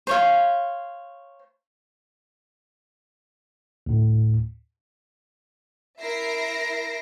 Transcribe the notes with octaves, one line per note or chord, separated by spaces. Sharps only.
C5 C#5 F5
D2 A2
E4 A#4 E5 A#6 C7 D7